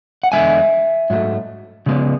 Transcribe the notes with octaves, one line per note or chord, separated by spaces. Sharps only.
F#5
E2 D3 G#3 E5 G#5
G#2 F#3 A3
C#3 G#3 B3